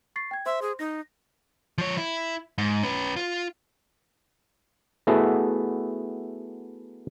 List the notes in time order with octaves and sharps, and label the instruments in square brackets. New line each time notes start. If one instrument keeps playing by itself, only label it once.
[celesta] C#6 A6 C7
G5 G#6
[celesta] C5 C6 [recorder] E5
[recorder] G#4
[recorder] D#4 [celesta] A#6
[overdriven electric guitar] F3 C#5
E4
G#2
C#4 B4
F4
[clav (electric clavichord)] A3 B3 E4 F#4 G#4 A4